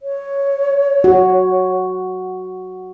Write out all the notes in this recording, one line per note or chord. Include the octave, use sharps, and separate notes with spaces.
C#5
F#4